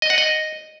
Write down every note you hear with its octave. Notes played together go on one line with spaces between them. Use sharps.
D#5
F#5
D#5